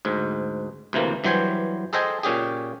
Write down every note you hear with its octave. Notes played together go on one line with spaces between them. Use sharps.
D2 G#2
D2 C3 E3 A#3
G2 E3 F#3 C5 G5 G#5
G#4 A4 C5 D#5 G5 G#5
A#2 C#4 G4 G#4